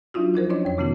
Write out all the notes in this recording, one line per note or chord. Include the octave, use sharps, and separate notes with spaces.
F#3 D4 D#4 F4 F#4
F3 D#4 A#4 C5
C#4 D4 E4 C#5 D#5
F2 C#5
C3 D#3 B3 C#4 D#4 F#4